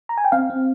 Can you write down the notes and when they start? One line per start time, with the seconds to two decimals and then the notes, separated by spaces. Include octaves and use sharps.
0.09 A#5
0.18 G#5
0.25 G5
0.32 C4 F5
0.50 C4